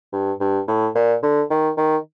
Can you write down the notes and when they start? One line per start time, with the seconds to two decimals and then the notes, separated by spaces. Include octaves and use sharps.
0.13 G2
0.40 G2
0.68 A2
0.95 A#2
1.23 D3
1.50 D#3
1.77 D#3